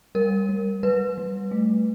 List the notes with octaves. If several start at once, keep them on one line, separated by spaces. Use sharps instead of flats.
G3 A#4
G3
G3 B4
G3
A3